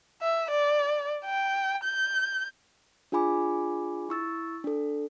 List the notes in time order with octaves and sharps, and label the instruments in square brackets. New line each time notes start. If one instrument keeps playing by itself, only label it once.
[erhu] E5
D5
G5
G6
[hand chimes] D4 F4 G#4 G#5 B5 D6
E4 C#6 E6 A6
D4 A4